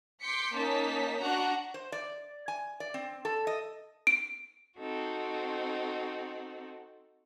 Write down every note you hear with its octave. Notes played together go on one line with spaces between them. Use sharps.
C6 D6 G6 B6 C#7
A#3 C#4 D#4 A5 B6
D4 F#4 A#5 C#6 F#6
C5
D5
G#5
D5
C4
A4
D#5
D7
C4 D#4 F#4 A4